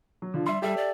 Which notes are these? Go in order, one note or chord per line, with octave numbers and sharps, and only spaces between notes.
F#3
D3 F3 F4
G3 E5 C6
G3 G4 A4 E5
D5